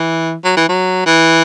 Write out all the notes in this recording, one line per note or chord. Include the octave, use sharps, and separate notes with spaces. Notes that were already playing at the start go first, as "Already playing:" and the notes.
Already playing: E3
F#3
E3
F#3
E3